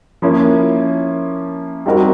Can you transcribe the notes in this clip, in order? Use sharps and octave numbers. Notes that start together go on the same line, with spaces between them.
F3 A#3 C#4 E4
G3 C4 D#4 F#4 A#4